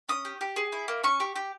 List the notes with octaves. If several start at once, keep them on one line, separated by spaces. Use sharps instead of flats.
C#4 D#6
G4
G4
G#4
E4
A#3
C#4 C#6
G4
G4